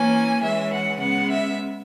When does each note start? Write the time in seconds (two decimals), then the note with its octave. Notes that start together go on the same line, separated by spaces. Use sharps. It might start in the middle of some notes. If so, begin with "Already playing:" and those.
Already playing: E3 A#3 C#4 G#5
0.42 E3 G#3 C#4 E5
0.71 F#5
0.99 C#3 G#3 B3 F#5
1.28 E5